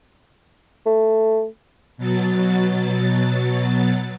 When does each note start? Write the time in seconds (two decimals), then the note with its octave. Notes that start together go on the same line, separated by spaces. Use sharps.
0.86 A3
1.97 B2 F#3 A6